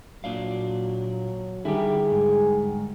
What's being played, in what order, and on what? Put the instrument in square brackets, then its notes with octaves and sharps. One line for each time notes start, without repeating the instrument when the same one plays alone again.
[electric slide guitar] A#2 D4 F5 [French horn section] F#3
[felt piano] D3 D#3 G3 [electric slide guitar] E4 G4 [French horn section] G#4
[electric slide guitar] G#2